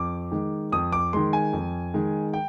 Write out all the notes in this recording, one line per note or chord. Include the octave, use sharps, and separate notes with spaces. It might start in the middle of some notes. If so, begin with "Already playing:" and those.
Already playing: F2 D6
D#3 G#3
F2 D#6
D6
D#3 G#3 C6
G#5
F2
D#3 G#3
G5